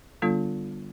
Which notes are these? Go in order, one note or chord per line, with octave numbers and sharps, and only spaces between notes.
D3 G3 B3 D4 F4 A4